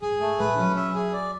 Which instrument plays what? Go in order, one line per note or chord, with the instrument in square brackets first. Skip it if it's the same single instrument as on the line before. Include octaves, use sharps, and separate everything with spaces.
[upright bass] G#2 [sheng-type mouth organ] G#4
[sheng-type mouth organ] A3
[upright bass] A2 [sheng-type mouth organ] B4
[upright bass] F#3 [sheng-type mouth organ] C#4
[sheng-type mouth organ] E5
G#4
D5